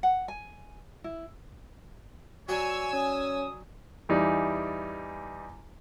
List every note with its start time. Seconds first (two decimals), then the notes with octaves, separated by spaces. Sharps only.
0.03 F#5
0.28 G#5
1.04 E4
2.49 F#3 C#5 D5 G#5 E6
2.93 C#4 D#6
4.09 E2 E3 G3 D#4 D5